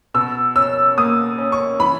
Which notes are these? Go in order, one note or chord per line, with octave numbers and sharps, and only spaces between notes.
B2 E6
C#4 E6
A#3 D#6
C#4
C#6
E3 B5